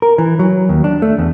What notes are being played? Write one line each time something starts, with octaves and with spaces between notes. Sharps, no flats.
A#4
E3
F#3
D#2
D4
A3
E2